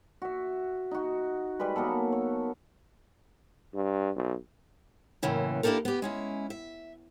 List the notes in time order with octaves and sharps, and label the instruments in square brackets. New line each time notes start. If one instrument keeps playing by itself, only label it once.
[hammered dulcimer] F#4 E5
D#4 F#4
G3 G#3 B4 B5
F#3 A#3 B3 A4
C#5
[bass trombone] G2
B1
[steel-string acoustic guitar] F#2 A2 C#3 E3 A#3
A#3 D4 E4 G4 A4 A#4
B3 G4
G#3 C#4 E4
E5